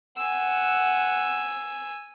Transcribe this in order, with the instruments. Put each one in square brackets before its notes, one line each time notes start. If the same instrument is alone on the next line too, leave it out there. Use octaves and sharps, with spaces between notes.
[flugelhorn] F#5 [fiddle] G#5 E6